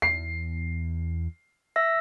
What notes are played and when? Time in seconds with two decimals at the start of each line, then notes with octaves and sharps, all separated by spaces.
0.02 E2 C7
1.76 E5 E6 A#6